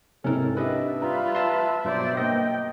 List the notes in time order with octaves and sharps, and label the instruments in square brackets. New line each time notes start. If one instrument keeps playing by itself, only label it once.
[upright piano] C2 G#2 C3 [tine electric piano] C#4 A#4 [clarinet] A4
[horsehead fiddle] D4 [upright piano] G4 [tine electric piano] B4 D#5 [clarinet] E5
[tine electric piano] G3 [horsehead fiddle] F4 B4 [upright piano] A#5
[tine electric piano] A5 C6
[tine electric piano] G2 B2 F#3 [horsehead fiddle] C5 D5
[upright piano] A#3 A#6 [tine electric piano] D#5 [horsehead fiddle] G5